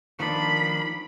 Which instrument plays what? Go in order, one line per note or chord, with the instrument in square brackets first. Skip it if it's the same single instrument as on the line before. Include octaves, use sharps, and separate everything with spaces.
[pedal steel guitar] D#3 F3 D4 [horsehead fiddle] B5